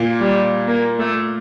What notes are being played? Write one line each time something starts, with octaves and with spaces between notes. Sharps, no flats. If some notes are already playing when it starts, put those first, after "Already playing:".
Already playing: A#2 A#3
G3
A#3
A3